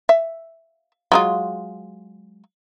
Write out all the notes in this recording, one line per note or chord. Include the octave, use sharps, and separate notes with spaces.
E5
F#3 G#3 F4